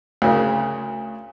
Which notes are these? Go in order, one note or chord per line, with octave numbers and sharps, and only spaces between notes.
D2 C#3 A#4